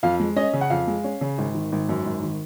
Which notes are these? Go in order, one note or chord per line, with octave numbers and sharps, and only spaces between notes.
F2 F5
G#3
C#4 D#5
C#3
F#5
F2 F5
G#3
C#4
C#3
G#1
D#3
G#1
F#2
G#1
D#3